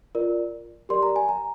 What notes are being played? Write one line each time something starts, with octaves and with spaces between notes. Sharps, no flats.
F4 A#4 D5
G4 A#4 D5 C6
A#5
G#5
A#5